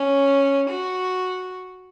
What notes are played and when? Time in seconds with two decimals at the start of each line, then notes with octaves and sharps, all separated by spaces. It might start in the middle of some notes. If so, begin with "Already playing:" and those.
Already playing: C#4
0.70 F#4